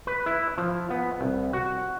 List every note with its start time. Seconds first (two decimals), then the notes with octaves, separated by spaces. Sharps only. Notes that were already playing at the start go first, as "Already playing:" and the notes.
0.07 B4
0.26 E4
0.58 F3
0.90 B3
1.21 C2
1.53 F#4